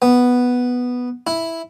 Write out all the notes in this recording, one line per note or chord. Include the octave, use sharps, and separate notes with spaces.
B3
E4